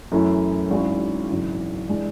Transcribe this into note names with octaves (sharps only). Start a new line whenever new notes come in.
F#2 E3 A3 C#4 E4
G#1 G#2 F#3 C#4 E4
G#1 F#2 C#3 E3
E3 G#3 D4